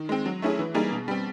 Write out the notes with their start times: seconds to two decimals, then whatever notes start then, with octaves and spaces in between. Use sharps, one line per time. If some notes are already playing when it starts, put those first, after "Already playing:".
Already playing: D#3
0.09 G#3 C4
0.26 F#3
0.42 A3 C#4 E4 G#4
0.59 E3
0.74 G3 A#3 D#4 G#4
0.92 B2
1.08 G3 C4